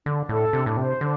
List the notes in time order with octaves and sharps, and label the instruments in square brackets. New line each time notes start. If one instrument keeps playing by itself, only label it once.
[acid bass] D3 [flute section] D4
[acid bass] A2 [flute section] A4
[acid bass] C3 [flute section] D4
[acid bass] A2
[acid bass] C3 [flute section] C5
[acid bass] D3 [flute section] D4